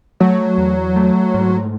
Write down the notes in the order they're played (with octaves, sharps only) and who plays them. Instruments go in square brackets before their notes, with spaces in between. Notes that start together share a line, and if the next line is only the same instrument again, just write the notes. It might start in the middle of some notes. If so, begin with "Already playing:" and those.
[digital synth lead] F#3 [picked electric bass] A3
[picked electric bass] E2
A3
G#2